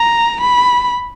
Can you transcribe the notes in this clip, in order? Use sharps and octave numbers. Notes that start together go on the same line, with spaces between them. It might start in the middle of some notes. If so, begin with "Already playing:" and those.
Already playing: A#5
B5